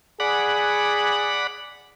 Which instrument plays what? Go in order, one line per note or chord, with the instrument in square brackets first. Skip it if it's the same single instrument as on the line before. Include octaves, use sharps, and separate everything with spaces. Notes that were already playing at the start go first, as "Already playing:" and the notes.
[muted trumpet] G#4 [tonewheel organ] D5 F#5 B5